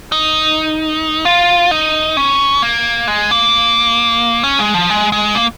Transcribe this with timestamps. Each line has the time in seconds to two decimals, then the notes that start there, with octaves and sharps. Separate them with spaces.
0.12 D#4
1.25 F4
1.71 D#4
2.17 C#4
2.62 A#3
3.07 G#3
3.31 A#3
4.44 C#4
4.59 G#3
4.74 F3
4.90 G#3
5.12 G#3
5.35 A#3